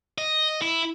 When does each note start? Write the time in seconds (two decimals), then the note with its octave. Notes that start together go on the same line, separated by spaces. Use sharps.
0.18 D#5
0.62 E4